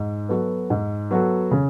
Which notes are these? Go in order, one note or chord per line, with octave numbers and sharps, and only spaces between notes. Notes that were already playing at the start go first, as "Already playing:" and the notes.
Already playing: G#2
F#3 B3 F#4 A4
G#2
F#3 B3 F#4 A4
C#3